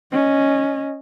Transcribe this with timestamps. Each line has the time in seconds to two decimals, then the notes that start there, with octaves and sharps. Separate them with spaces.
0.12 C#4 D#5